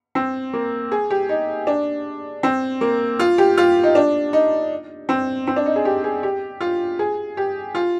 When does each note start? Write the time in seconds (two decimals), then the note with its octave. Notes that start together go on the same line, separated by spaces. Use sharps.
0.15 C4
0.53 A#3
0.92 G#4
1.10 G4
1.29 D#4
1.67 D4
2.43 C4
2.81 A#3
3.19 F4
3.38 G4
3.58 F4
3.83 D#4
3.95 D4
4.33 D#4
5.09 C4
5.47 C4
5.56 D4
5.66 D#4
5.76 G#4
5.85 G4
6.04 G#4
6.23 G4
6.60 F4
6.99 G#4
7.37 G4
7.75 F4